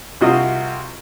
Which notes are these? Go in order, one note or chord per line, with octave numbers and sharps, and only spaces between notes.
C2 C3 F4 F#4 D#5